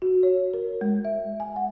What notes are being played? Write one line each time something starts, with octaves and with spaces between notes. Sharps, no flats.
F#4
C#5
A#4
G#3
E5
G#5
F#5